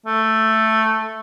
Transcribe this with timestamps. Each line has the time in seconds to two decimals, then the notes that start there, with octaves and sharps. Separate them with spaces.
0.06 A3